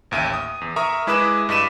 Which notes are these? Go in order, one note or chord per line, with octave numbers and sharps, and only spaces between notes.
A1 D#2 E5 D#7
D#6
E2
A#4 E5 A#5 C#6 D#6
G#3 E4 B4 D6 D#6 E7
G2 D#5 D6 B6 D#7 E7